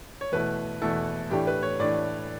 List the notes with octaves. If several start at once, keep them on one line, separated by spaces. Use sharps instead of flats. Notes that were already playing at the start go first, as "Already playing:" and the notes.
C#5
E2 B2 A3 E4 B4
E2 B2 A3 E4 A4
A2 E3 A3 D4 G4
B4
C#5
A2 E3 A3 D4 D5